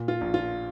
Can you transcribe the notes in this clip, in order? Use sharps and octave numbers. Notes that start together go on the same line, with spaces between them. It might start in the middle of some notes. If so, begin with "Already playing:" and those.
Already playing: A#2
F4
A#1
F4